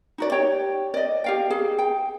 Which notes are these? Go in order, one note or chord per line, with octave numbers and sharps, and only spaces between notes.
D#4 F#4 D5
G4 C#5 G5
D5 D#5
G4 F5 G5
G#4
G5